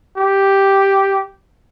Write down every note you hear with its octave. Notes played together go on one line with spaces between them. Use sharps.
G4